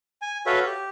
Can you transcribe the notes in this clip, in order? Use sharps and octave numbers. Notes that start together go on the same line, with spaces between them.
G#5
F#4 A4 B4 C#5 E5 F5
G4